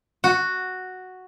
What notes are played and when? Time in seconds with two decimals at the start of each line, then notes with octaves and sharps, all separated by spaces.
0.24 F#4